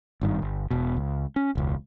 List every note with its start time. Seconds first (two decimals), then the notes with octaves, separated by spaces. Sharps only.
0.21 G#1 G2 D#3
0.42 G1
0.71 E1 B2
0.96 C#2
1.36 C#4
1.55 E1 C#2